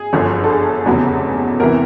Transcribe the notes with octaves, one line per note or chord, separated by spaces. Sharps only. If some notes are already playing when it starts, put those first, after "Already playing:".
Already playing: G#4
G1 F#2 D3 F3
A4
G#4
F1 E2 C#3 F#3
E2 C3 E3 A#4